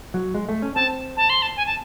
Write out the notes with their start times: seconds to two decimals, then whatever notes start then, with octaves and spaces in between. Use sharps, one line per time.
0.14 F#3
0.35 G#3
0.49 A3
0.62 C#4
0.75 C4 A5
1.17 A5
1.30 C6
1.42 A5
1.57 G#5
1.66 A5